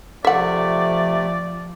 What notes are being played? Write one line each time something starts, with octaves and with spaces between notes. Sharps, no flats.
C3 F3 A3 D5 E5 F#5